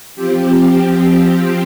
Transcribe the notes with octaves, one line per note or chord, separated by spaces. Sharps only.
F3 C4 G4